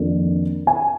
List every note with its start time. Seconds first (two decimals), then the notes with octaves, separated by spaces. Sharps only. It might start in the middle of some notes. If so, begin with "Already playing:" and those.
Already playing: F2 D#3 A#3 D4
0.67 G#5